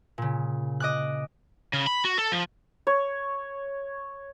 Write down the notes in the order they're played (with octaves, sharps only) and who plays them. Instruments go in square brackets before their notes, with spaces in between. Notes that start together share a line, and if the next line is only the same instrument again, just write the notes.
[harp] A#2 C#3
D#5 D6 F#6
[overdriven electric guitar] C#3
B5
F#4
A4
F3
[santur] C#5